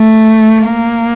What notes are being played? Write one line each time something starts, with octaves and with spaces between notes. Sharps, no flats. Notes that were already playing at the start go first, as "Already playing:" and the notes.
Already playing: A3
A#3